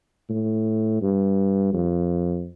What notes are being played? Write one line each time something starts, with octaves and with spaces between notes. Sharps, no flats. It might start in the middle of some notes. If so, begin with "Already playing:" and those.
A2
G2
F2